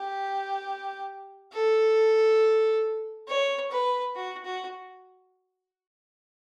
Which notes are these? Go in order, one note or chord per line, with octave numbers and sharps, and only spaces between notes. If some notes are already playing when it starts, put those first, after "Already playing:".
Already playing: G4
A4
C#5
B4
F#4
F#4